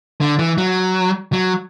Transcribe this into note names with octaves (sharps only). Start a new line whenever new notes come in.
D3
E3
F#3
F#3